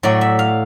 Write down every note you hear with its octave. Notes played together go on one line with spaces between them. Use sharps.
A2 F#3 D5
E5
F5